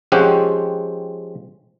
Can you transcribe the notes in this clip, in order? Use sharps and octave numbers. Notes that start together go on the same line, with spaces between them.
F3 G#3 C4 C#4 G4 F#5